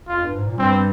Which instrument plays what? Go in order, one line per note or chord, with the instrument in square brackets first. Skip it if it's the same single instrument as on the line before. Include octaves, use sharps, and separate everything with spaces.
[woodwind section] F2 [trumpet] F4
[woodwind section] G2
G#2
A#2
[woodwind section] G2 G3 [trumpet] C4